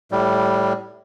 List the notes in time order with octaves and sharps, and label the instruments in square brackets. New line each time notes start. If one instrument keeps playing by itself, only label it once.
[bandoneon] A2 G3